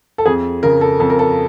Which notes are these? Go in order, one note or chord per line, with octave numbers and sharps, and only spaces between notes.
A4
F2 G#4
C#3 A#4
A4
F2 A4
A#4
A4